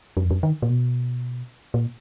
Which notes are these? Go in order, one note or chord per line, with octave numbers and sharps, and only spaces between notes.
F#2
F2
F#2
D#3
A#2
B2
A#2